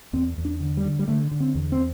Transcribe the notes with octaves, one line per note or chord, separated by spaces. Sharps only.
E2 C4
E2
D4
D3
G3
D3
G3
D3 A3
D3
C4
E2
C4